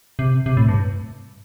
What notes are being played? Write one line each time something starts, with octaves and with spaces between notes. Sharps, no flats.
C3
C3
A2
G2